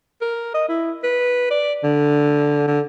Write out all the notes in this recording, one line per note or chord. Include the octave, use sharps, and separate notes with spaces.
A#4
D#5
E4
B4
D5
D3
D3